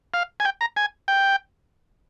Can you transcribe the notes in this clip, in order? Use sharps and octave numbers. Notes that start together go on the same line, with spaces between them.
F5
G#5
G5
A#5
G#5
G5